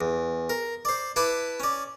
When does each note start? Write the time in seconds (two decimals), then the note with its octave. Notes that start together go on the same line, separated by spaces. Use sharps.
0.01 E2
0.50 A#4
0.85 C5 D5
1.16 E4 B4 A5 D6
1.60 C#4 D5